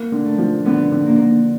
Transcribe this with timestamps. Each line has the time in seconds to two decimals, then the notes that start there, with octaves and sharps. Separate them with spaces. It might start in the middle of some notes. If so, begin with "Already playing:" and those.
Already playing: A#3
0.12 D3
0.25 A3
0.38 F3
0.65 D3 B3
0.92 D3
1.06 A#3
1.19 D3